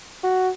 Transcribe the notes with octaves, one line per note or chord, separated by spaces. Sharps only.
F#4